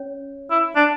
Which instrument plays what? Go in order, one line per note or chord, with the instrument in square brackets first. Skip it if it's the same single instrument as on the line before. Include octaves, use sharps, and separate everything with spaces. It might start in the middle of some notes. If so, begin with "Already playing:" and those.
Already playing: [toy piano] C#4 C#5
[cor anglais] E4
D4